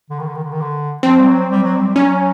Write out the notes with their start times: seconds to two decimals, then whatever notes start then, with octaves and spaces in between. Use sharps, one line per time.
0.10 D3
0.19 D#3
0.27 D3
0.35 D#3
0.44 D3
0.52 D#3
0.61 D3
1.03 F3 C4
1.19 G3
1.27 F#3
1.50 G3
1.63 F#3
1.77 G3
1.89 G3
1.96 F#3 C#4